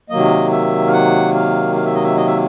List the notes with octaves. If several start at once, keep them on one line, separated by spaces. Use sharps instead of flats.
C3 D#3 F#3 A#3 D#5
E5
F5
F#5
F5
F5
E5
D#5
E5
D#5
E5